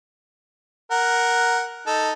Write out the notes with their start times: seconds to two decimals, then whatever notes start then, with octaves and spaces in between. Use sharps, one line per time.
0.91 A#4 F#5
1.87 D#4 A4